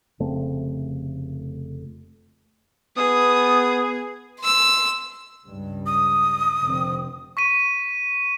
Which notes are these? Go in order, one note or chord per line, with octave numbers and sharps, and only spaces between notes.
F1 C#3 A3 C4
B3 G#4 D#6
C6 E6
C#2 G2
D#6
F1 D3 C4
C#6 B6 D#7